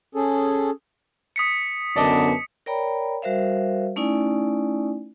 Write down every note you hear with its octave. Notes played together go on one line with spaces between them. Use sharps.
C#4 G#4 A4
D#6 B6 C#7
F#2 D3 B3 D5 D#5 A5 D6
A#4 C#5 D5 G5 A#5 B5
G3 F#4 A#4 C5 E5 F5
A3 C#4 D#4 E4 D5 G#5